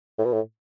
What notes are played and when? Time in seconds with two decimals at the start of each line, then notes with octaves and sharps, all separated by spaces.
0.19 A2
0.25 B2
0.33 A2